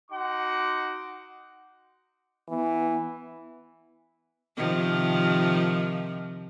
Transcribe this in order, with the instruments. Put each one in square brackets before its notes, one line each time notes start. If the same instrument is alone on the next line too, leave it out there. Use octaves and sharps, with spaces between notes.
[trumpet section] D#4 F#4 F#5 C6 D6
[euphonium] E3 [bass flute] B3
[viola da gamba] C3 D#3 F3